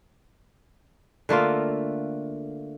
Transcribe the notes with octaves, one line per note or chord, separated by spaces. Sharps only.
D3 A3 A#3 F4